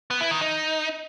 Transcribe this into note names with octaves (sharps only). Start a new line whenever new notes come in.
B3
E4
D#3
D#4